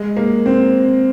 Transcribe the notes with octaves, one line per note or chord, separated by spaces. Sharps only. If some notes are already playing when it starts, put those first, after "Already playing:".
Already playing: G#3
A#3
C4